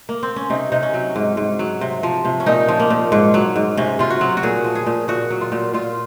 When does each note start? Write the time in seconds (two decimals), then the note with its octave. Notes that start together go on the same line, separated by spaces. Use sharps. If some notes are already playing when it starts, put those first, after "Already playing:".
0.09 A#3
0.23 C4
0.36 C#4
0.50 C3 D#4
0.72 C3 D#4
0.83 C#4
0.94 F#3
1.16 G#2
1.37 G#2
1.59 F#3
1.81 C3
2.03 F3
2.25 C3
2.40 C#4
2.46 A#2 D#4
2.68 F3
2.80 A#3
2.90 A#2
3.12 G#2
3.34 F#3
3.56 G#2
3.77 C3 C#4
3.99 C3 F4
4.10 F#4
4.21 F#3
4.37 F#4
4.43 A#2 G#4
4.64 F3
4.75 G#4
4.86 A#2
5.08 A#2 F#4
5.30 F#3
5.41 F4
5.52 A#2
5.73 A#2 F4